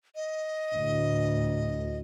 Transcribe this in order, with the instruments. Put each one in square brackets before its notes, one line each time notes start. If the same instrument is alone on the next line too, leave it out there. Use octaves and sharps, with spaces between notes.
[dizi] D#5
[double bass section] D2 A2